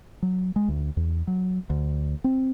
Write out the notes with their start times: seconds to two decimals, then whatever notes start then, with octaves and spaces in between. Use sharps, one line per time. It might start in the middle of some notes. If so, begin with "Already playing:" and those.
0.23 F#3
0.56 G#3
0.68 D2
0.97 E2
1.27 F#3
1.70 D2
2.24 C4